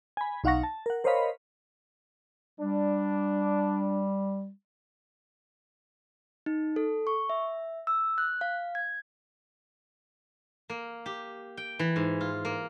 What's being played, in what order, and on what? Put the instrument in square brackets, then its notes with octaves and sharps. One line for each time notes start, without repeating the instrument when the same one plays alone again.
[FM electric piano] G#5 B5
B1 D#4 F5 F#5 C#6 A#6
A5
A#4 F#5
A#4 C5 C#5 D#5 F5 B5
[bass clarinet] G3 [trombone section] D4
[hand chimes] D#4
A4
C#6
E5
E6
F#6
F5
G#6
[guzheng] A#3
G4
G5
E3
G#2
F4
A#3